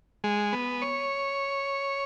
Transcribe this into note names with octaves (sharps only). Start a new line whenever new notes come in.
G#3
B3
C#5